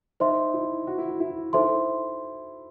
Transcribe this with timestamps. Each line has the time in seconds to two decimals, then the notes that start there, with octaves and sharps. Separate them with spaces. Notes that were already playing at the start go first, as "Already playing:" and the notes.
0.20 D#4 C5 E5 C6
0.54 E4
0.87 F#4
0.98 E4
1.09 F#4
1.20 E4
1.53 D#4 E4 A4 C5 E5 C6